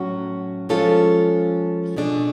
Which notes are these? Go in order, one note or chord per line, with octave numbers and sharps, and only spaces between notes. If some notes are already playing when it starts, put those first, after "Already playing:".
Already playing: A2 F#3 C#4 F#4
F3 G#3 C#4 F4 A4
B2 A3 D4 G#4